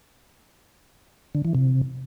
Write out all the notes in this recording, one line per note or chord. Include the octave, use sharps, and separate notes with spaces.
D3
E3
C3